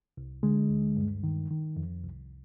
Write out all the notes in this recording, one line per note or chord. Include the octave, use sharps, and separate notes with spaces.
C2
D3 G#3
D2
G2
D#3
D#3
F2
C2